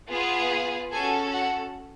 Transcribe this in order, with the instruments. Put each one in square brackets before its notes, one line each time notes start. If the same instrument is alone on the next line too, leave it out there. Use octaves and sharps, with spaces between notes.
[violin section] B3 F4 G#4
C#4 F#4 G#4 A4 G#5
F#4 F#5